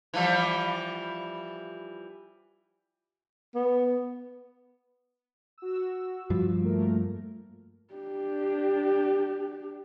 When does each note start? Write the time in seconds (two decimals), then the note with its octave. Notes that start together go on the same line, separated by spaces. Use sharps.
0.14 E3 F3 G3
3.55 B3
5.58 F#4 E6
6.30 G2 F3
6.63 A3 A#3 A#4
7.94 D4 G4